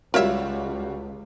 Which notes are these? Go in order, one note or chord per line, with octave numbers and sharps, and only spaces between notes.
C#2 G3 F4 F#4 A#4 C#5 E5